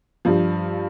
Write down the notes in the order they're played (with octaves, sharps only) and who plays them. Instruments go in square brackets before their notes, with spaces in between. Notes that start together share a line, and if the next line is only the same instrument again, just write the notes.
[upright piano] G2 F3